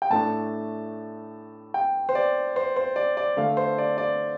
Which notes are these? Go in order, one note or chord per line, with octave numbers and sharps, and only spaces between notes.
G5
A2 A3 D4 A5
G5
C5
D5
C5
C5
D5
D5
D3 A3 D4 F5
C5
D5
D5